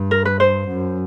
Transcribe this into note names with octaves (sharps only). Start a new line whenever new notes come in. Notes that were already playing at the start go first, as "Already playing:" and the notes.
Already playing: G2
A#4
B4
C5
F#2